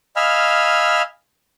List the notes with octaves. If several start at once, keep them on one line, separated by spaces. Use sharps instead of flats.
D#5 F5 G#5 B5 E6 F6